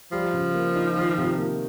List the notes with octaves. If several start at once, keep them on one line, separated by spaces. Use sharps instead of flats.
F3 G3
C#3
A#3
D#4
D#3
C3
A#3